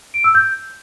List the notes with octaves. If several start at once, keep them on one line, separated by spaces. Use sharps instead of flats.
D7
E6
G6